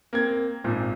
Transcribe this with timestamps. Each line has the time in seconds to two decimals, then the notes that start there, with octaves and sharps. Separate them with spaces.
0.13 A#3 C4 G#6
0.64 G#1 A#2